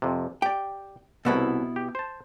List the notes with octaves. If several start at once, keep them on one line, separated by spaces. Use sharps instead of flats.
F2 C3
G4 D5 G5
C2 B2 B3 E4 F#4 A4
G4
C5 A5